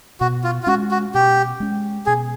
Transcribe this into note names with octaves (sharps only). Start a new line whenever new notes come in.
B2 F#4
F4
F4
G#3 C#4 F#4
F#4
B2 G4
G#3 C#4
B2 G#4